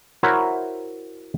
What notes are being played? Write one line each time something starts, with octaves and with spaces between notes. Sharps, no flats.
E4 F#4 A#4 C5 C#5 E5